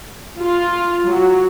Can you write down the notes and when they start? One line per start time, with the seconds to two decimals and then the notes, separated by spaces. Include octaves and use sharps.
0.39 F4
1.06 F#3